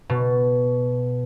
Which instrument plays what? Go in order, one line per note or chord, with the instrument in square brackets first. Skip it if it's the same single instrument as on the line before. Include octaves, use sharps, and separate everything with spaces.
[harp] B2